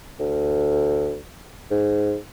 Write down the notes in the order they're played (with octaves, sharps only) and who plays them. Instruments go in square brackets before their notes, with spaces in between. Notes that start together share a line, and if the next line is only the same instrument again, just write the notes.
[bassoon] D2
G#2